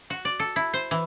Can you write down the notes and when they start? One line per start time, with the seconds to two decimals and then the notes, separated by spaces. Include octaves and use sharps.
0.10 F#4
0.25 D5
0.40 A4
0.56 E4
0.74 C5
0.91 E3